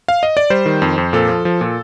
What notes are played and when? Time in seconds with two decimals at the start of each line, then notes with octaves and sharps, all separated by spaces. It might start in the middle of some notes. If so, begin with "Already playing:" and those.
0.08 F5
0.23 D#5
0.37 D5
0.50 G3 C5
0.66 D#3
0.82 F2
0.98 F2
1.13 A#2 A4
1.29 F3
1.45 F3
1.61 A#2